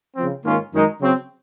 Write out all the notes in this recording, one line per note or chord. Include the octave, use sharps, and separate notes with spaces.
C#3 F3 C4
G#2 D#3 A#3 C#4 F4
F#2 D#3 G#3 D#4
C#3 F#3 C4